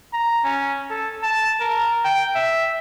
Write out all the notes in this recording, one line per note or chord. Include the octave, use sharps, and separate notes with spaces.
A#5
C#4
A4
A5
A#4
G5
E5